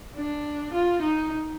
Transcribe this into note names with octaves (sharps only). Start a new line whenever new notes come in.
D4
F4
D#4